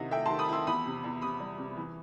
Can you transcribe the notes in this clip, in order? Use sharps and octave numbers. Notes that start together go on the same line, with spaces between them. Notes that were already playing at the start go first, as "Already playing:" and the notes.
Already playing: C3 D#3 E4 D#5 F#5
A3 E5 G5
D#3 A5 C6
B5 D#6
E4 C6 E6
E2 B5 D#6
C3
E2
C3 B5 D#6
G3
C3
E3